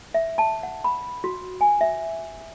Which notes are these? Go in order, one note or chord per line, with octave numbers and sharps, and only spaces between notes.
E5
A5
F#5
B5
F#4
G#5
E5